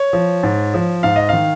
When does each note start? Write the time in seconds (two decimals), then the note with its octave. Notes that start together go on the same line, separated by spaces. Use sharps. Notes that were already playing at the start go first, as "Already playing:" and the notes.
Already playing: C#5
0.13 F3
0.43 G#2
0.74 F3
1.03 G#2 F5
1.16 D#5
1.29 D#3 F5